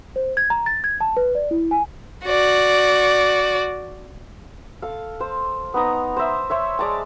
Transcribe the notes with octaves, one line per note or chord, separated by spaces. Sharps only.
C5
G#6
A#5
A6
G#6
A5
B4
D5
E4
G#5
F#4 D5
A4 F5
C5
B3 D#4 A#5
C5 E5
C5 C#5 E5
G#3 D5 A5 A#5